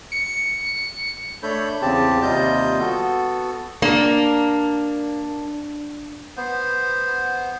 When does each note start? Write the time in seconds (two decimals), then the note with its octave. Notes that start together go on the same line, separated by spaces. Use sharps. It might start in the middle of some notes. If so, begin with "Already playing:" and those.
0.12 C#7
1.43 A3 D4 A4 C#5 B5 G6
1.82 E2 C#3 C4 G4 A5
2.22 D#2 C3 G3 F4 D#5 G6
2.79 B3 F#4 A4
3.82 A#3 D4
6.37 B3 C5